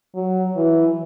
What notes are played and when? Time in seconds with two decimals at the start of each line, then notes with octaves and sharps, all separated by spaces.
0.15 F#3
0.56 E3